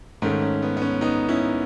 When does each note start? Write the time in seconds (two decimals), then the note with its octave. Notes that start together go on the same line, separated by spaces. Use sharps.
0.22 G#2 D#3 A3 C#4
0.42 C#4
0.62 B3
0.77 B3
0.82 C#4
1.01 B3 D#4
1.29 C#4 E4